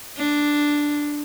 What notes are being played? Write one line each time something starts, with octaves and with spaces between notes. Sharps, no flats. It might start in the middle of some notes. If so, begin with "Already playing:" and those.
D4